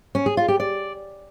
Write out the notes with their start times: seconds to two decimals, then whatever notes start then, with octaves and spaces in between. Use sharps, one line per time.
0.15 C#4
0.26 G#4
0.37 F4
0.48 G4
0.60 D5